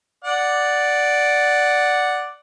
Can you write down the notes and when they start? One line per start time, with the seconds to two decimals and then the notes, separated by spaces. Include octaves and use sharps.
0.24 D5 F#5